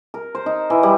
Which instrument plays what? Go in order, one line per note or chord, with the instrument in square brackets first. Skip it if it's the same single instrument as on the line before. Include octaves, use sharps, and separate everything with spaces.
[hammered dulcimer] A#4
C5
D#4
E3
G3